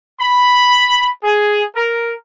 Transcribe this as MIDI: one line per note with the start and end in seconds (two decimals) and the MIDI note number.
0.19 1.07 83
1.23 1.62 68
1.75 2.12 70